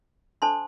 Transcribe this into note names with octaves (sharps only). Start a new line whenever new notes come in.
D4 A4 C5 A5 C6